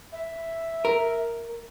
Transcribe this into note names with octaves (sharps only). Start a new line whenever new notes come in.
E5
A#4